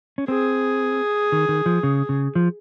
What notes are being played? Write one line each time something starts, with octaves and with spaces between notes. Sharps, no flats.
C#4
C4 G#4
D#3
D#3
F3
C#3
C#3
F3